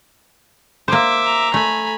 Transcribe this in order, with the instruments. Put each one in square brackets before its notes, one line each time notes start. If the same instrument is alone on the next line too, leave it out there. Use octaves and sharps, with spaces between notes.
[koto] A#3 C5 [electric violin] E5 D6
[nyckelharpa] A#5
[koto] A3 [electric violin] G#5 B5